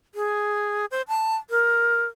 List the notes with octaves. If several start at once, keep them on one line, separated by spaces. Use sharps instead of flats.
G#4
C5
A5
A#4